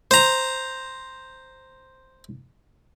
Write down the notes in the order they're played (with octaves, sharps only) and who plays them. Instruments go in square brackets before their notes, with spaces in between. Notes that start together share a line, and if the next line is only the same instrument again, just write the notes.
[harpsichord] C5 A#5